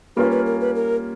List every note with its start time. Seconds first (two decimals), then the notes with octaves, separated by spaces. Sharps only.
0.16 G3 A#3 C#4 F4 B4
0.31 B4
0.46 A#4
0.61 B4
0.76 A#4